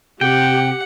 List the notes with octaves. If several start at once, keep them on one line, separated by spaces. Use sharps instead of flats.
C3 G4 F#5 G5